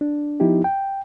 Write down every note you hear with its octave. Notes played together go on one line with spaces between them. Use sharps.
D4
F3 B3 D#4 E4 G4
G5